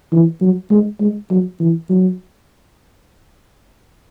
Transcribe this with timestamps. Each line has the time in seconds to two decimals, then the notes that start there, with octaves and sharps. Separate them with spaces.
0.12 E3
0.41 F#3
0.71 G#3
1.01 G#3
1.31 F#3
1.60 E3
1.90 F#3